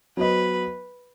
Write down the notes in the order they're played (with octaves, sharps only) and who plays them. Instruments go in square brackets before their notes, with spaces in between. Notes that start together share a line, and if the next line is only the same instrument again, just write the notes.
[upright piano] F#3 B3 F#4 C5 D#5 [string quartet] B4